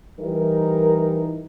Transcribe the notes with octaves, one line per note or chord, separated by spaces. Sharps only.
E3 G3 D#4 A#4